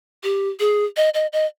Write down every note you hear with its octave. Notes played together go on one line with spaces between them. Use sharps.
G4
G#4
D#5
D#5
D#5